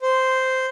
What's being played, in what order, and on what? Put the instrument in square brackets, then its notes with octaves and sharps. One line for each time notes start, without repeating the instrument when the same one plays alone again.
[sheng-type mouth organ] C5